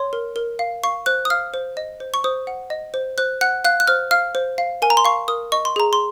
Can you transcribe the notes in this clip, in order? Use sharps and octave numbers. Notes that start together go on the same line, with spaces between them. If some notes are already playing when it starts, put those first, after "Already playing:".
Already playing: C#5 C6
A#4
A#4
F5
F5 C#6
C5 F#6
D#6
F5 F6
C5
D#5
C5
C#6
C5 D#6
F#5
D#5
C5
C5 F#6
F#5 F#6
F5 F#6
F#6
C5 F6
F5 F6
C5
F5
A#4 G#5
A#5
C6
F5 C#6
A#4 D#6
D#5 C#6
C6
G#4 A#5
C6